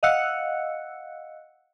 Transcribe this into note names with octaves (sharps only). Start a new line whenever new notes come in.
D#5 F5 F#5 E6 F#6 C#7